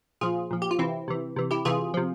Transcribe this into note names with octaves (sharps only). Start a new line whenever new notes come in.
A#2 F3 F4 G#4
A#2 F3
G4
F4
C3 E3 C4 E4
C3 E3
C3 E3
E4 G4
C3 E3 F4 G#4
C3 F3